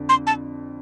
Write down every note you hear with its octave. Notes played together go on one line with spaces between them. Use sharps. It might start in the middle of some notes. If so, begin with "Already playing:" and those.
Already playing: F2 D3
C6
A5